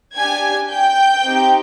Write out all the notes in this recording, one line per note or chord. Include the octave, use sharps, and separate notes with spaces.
D4 G4 G#5 G#6
G5 G6
C4 D#4 G4